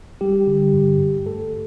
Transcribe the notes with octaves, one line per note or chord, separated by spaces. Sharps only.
G3 G4
D3
G2
G2
A3 A4